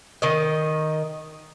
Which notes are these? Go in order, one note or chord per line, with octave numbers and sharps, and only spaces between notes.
D#3 D#5